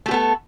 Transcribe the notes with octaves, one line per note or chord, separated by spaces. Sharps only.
A3 B3 G4 A4